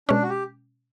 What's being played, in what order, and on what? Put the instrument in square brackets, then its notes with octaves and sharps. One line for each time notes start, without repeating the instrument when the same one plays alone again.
[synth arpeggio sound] B2 G#3 C#4 [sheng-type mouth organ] D4
[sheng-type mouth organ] F#4
G4